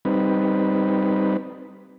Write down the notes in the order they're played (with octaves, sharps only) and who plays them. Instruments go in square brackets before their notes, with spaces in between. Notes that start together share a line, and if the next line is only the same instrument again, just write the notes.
[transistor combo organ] G3 C4 D#4 B4